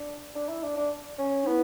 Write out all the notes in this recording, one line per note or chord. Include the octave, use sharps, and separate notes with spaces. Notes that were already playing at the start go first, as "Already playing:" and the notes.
Already playing: D4
D4
E4
D4
D4
C#4
D4
B3 E4